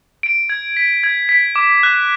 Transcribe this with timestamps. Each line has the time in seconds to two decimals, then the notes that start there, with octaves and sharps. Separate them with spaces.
0.23 D7
0.49 G#6
0.77 B6
1.04 G#6
1.29 B6
1.56 D6
1.83 F#6